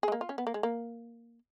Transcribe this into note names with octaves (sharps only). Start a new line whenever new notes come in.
G#4
G#3
A#3
F4
C#4
B3
A#3
G#3
A#3